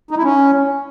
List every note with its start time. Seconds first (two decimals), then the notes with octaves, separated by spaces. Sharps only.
0.11 D#4
0.17 E4
0.23 C#4